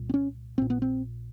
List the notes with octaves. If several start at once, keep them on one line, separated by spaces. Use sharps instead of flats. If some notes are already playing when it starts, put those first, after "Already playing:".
Already playing: C2 A#2
C4
C#4
A#1 A#2 C4
B3
C4